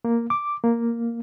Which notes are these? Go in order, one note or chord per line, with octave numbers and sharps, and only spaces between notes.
A#3
D6
A#3